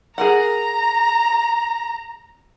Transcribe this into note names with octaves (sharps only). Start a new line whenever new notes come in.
G#4 A#4 F#5 A#5